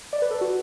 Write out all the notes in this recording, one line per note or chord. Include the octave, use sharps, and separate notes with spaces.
D5
B4
A4
F#4